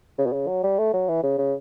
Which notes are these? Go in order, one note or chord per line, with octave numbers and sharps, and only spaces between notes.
C#3
B2
C#3
F#3
G3
A3
F#3
E3
C#3
C#3